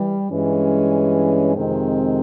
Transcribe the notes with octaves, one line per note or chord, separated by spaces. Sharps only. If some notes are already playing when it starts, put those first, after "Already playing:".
Already playing: E3 G3
G2 E3 G#3 C#4
F2 C3 D#3 G#3 C4